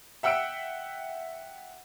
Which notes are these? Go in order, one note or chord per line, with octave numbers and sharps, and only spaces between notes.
E5 F#5 G5 E6 C#7 D7